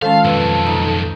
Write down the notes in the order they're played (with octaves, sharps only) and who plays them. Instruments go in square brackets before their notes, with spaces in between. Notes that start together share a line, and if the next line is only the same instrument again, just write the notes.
[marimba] D#3 G#3 C#4 [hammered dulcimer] F3 [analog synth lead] A4 [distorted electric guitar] F5
[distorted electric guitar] B1 F2 [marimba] B4
[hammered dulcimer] D#4